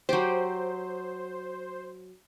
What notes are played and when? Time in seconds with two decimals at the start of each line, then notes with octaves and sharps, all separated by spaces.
0.09 F#3 G4 C5